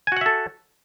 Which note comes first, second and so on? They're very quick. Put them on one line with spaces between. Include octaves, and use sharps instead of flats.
G#5 F#4 F#5 E5 A4